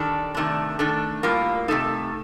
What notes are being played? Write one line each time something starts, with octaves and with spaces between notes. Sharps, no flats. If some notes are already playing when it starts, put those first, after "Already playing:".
Already playing: D#3 G3 D4 A4
C3 D#3 A3 D4
D#3 A3 D4 A4
A2 G3 A#3 F4
C3 D#3 A3 D#4 A4